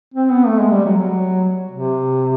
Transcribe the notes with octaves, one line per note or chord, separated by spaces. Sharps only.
C4
B3
A3
G#3
G3
F#3
F#3
C3